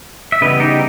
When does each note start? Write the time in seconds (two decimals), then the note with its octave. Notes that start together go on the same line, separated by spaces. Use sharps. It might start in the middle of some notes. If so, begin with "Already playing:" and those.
0.32 E5
0.41 C#3 E3 G3 B3 B4 D#5
0.60 D#4 G4